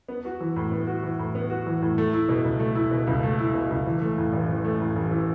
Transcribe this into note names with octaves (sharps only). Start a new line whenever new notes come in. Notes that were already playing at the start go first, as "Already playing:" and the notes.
B3
F#4
E3
A2
B3
F#4
E3
A2
B3
F#4
E3
A2
A3
E4
B2
C#2
A3
E4
B2
C#2
A3
E4
B2
C#2
E3
A3
A2
A1
E3
A3
A2
A1
E3